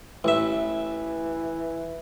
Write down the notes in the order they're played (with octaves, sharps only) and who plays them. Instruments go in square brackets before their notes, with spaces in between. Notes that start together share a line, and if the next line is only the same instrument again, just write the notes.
[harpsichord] A1 E5 [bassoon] E3